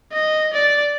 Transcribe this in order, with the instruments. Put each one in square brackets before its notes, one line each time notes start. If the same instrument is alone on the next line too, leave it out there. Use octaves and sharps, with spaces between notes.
[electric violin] D#5
D5